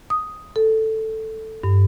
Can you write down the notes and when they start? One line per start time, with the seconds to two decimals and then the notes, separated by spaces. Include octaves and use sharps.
0.10 D#6
0.56 A4
1.64 G2